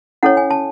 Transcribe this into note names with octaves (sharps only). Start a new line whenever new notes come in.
C#4 E4 A4 C#5 F#5
G#5
A5